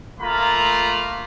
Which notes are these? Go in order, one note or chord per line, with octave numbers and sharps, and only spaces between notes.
A3 A#3 F4 A#5 B5